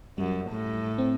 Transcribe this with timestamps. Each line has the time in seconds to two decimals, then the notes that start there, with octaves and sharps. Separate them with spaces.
0.18 F#2 G3
0.51 A2
0.98 C4